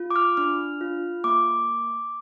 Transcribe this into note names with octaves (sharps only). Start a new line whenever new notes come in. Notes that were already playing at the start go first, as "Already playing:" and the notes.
Already playing: F4
D6
F6
D4 F6
F4
A#3 D6